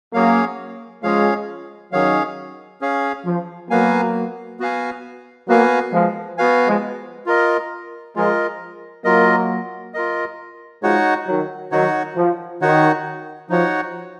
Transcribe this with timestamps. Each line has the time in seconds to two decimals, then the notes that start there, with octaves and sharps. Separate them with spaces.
0.14 F#3 A#3 C#4 G#4 C#5 F5
1.03 F3 G#3 C#4 G#4 C#5 F5
1.92 D#3 F#3 C#4 G#4 C#5 F5
2.81 C#4 G#4 C#5 F5
3.25 F3
3.70 F#3 A#3 B3 F#4 B4 F5 G#5
4.60 B3 F#4 B4 F5 G#5
5.48 F#3 A#3 B3 F#4 B4 F5 G#5
5.92 F3 G#3
6.37 B3 F#4 B4 F5 G#5
6.67 F3 G#3
7.26 F4 A#4 D#5
8.16 F3 G#3 F4 A#4 D#5
9.04 F#3 A#3 F4 A#4 D#5
9.94 F4 A#4 D#5
10.83 F3 G#3 D#4 F#4 C#5 F#5
11.27 D#3 F#3
11.71 D#3 F#3 D#4 F#4 C#5 F#5
12.16 F3
12.61 D#3 D#4 F#4 C#5 F#5
13.50 F3 D#4 F#4 C#5 F#5